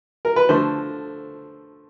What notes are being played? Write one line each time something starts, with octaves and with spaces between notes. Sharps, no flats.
A#4
B4
D3 F3 A3 C5